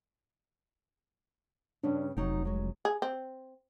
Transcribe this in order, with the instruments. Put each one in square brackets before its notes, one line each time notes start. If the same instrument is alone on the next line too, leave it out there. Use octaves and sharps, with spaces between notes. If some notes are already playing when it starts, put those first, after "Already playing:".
[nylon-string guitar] G2 C#3 [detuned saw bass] D4
[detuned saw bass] F1 [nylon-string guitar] F#3 D#4 G5
[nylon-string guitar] F#3 G#3
[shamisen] G#4
C4